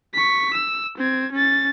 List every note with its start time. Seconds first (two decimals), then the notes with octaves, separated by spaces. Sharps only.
0.14 C#6 B6
0.54 E6
0.98 C4 G#6
1.32 C#4 A6